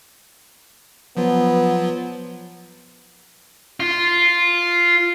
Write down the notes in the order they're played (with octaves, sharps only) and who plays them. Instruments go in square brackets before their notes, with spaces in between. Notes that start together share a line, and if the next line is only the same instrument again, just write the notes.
[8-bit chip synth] F3 F#3 F4 [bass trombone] B3
[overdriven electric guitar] F4